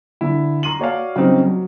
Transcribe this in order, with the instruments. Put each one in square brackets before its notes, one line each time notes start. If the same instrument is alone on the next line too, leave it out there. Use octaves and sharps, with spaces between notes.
[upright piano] D3 E4
A#5 C6 D#7 F#7
F#4 C#5 D5 F5
C#3 F#3 G3 C4 D#4
F#3